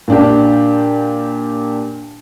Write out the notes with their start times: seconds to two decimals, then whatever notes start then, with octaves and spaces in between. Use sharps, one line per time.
0.08 A#2 D4 G4